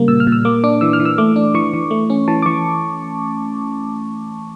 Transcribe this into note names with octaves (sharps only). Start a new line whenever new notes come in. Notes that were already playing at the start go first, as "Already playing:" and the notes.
Already playing: C#3 G3 A#3
A#2 E6
F6
A#2
E6
A#3 D6
D4 D6
E3 E6
F6
E3
E6
A3 D6
D4
E3 C#6
E3
A3
C#4
E3 A5
D6
E3 C#6